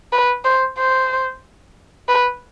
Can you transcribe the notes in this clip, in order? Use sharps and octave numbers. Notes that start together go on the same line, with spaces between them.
B4
C5
C5
B4